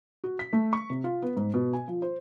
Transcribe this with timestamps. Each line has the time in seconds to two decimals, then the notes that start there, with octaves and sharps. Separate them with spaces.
0.24 F#4
0.39 B6
0.53 A3
0.73 C#6
0.90 C3
1.04 F4
1.22 B3
1.37 G#2
1.54 B2
1.73 G#5
1.88 F3
2.02 C5